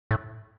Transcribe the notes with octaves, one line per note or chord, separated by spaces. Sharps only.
A2